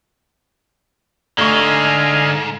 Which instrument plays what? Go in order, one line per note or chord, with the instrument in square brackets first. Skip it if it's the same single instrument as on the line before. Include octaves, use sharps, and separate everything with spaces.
[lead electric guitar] G#2 [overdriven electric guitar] D3 [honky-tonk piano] A3 C#6 [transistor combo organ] D#5 F5 G#5